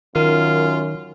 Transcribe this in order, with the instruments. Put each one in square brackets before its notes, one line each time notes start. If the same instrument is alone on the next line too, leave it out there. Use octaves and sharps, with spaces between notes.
[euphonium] F#2 [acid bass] D#3 [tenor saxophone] F4 [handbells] A#4